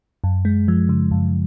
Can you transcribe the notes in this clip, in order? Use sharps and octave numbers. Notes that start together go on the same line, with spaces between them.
F#2
G#3
F3
C#3
F#2